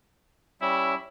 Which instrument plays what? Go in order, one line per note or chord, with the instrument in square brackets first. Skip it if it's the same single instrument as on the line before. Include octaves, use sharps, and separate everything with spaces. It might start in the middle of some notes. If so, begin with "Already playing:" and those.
[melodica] G3 C#4 [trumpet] E4